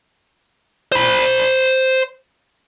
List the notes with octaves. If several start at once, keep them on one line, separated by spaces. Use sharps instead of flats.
C5 B5